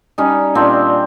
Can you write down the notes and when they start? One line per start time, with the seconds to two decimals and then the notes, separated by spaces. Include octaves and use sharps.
0.18 G3 C#4 D#4
0.55 A#2 C4 D4